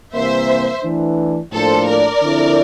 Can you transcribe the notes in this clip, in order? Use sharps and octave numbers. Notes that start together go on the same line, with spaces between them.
C3 E3 G3 A#3 C5 E5
E3 A3 D4
A2 F3 A#3 D4 A4 C5
A#4 D5
D3 F3 C4 E4